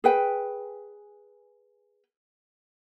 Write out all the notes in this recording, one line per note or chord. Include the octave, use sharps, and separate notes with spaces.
G#4 B4 G5